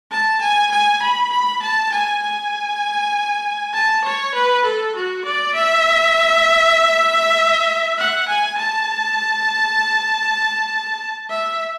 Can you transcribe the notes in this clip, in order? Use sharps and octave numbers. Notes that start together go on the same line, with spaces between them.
A5
G#5
G#5
B5
B5
A5
G#5
G#5
A5
C#5
B4
A4
F#4
D5
E5
F#5
G#5
A5
E5